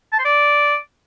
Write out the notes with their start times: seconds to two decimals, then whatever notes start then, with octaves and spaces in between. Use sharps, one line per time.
0.12 A5
0.19 C5
0.25 D5